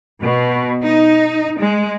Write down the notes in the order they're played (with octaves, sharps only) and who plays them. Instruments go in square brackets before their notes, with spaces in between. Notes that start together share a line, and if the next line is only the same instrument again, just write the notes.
[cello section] B2
D#4
G#3